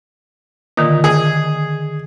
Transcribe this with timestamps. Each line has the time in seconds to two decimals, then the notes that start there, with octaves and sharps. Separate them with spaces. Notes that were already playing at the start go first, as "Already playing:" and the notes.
0.77 A#2 D3 D#3 D#6
1.04 G#4